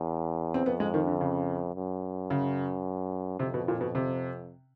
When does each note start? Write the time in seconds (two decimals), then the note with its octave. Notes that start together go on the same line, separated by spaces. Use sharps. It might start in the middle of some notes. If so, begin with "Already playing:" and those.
Already playing: E2
0.54 C4
0.65 F2 B3
0.80 G#3
0.94 D#3
1.07 D3
1.21 C#3
1.75 F#2
2.30 C#3
3.39 F2 C3
3.54 B2
3.68 A#2
3.81 B2
3.95 C3